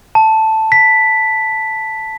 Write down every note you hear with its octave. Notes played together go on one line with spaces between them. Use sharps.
A5
B6